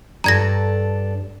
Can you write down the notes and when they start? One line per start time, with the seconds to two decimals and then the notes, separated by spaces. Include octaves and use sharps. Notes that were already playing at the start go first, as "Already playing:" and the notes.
0.24 G2 D4 A4 A#5 G#6 A#6